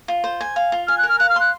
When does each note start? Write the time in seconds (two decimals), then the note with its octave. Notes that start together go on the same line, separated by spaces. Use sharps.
0.08 F4
0.24 C5
0.41 G#5
0.56 F5
0.72 F4
0.87 G#5 F6
0.98 F#6
1.03 A#4
1.09 F6
1.19 F5 F#6
1.29 F6
1.36 C6 F#6